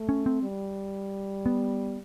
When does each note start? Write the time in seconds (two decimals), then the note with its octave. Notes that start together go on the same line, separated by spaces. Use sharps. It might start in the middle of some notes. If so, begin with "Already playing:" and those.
Already playing: A3
0.09 C#4
0.26 C4
0.42 G3
1.46 B3